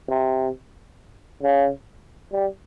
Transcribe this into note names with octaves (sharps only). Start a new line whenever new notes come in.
C3
C#3
G3